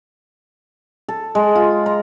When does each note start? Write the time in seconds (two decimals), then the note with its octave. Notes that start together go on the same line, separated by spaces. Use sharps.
1.09 A4
1.35 G#3
1.55 F4
1.86 A#5